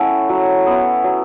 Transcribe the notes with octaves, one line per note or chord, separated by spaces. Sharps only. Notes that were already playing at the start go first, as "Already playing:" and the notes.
Already playing: A3 C#4 E4 E5 F#5
F#3
B3 E4
F#3